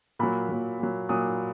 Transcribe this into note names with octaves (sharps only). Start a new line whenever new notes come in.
A#2 F#3 B5
A#2 F#3
A#2 F#3
A#2 F#3 D#6